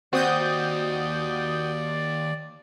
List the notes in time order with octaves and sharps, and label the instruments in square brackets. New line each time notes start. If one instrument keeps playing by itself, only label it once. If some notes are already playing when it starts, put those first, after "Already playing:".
[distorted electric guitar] D#2 [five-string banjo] C4 [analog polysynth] F#4 D#6 G6 [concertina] D5